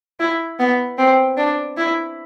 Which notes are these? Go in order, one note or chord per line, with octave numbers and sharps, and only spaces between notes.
E4
B3
C4
D4
E4